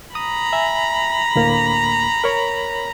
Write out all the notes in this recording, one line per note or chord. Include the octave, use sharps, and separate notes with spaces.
A#5 B5 D#6
E5 G#5
D2 A2 A#3
A#4 C#5